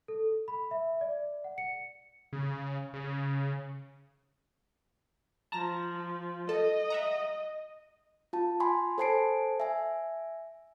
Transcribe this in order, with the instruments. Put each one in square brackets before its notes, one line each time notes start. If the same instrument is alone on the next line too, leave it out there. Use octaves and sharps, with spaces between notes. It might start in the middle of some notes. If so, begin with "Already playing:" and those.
[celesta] A4
B5
E5
D5
F#5
C#7
[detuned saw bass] C#3
C#3
[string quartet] F3 [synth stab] A5 A#5 A#6
[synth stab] A4 A5 [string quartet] D#5
[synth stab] E5 F#5 A#5
[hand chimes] F4 A5
G#5 B5 C6
A4 C5 G#5 A5 C7 D7
E5 G#5